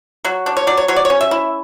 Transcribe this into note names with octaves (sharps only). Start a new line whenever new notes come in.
F#3 F#4
D4
C#5
F#3 D5
C#5
F#3 C#5
D5
C#5
C#4
E5
E4